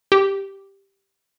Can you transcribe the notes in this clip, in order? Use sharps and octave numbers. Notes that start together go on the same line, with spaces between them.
G4